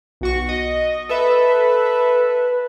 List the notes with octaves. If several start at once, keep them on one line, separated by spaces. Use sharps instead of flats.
B1 F#4 C#6
D#5
A4 B4 E5